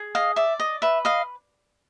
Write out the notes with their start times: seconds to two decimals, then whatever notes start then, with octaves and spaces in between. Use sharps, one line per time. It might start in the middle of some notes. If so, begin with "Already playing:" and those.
Already playing: G#4
0.15 D#5 F5
0.36 D5 E5
0.60 D#5
0.82 B4 E5
1.05 D#5 F5